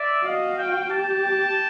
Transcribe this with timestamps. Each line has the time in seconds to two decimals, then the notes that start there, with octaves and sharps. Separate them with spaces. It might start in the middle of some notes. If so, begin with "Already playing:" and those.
Already playing: D5 E5
0.24 F#4 D#5 F5
0.57 F5 G5
0.90 G4 G5 A5